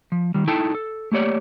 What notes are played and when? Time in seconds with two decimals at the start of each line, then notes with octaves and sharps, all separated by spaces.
0.12 F3
0.34 D#3 G3
0.47 D#4 E4 A4 G5 A5
0.75 A4
1.12 A3 A#3 G4 C#5 D5